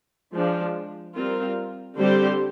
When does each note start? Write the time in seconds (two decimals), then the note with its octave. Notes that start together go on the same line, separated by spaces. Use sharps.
0.35 F3 G#3 D4
1.16 G3 C4 F4 A#4
1.97 D3 G3 C4 G4 C5